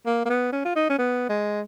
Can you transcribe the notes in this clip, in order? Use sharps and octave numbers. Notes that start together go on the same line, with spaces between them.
A#3
A#3
B3
C#4
F4
D#4
C#4
B3
G#3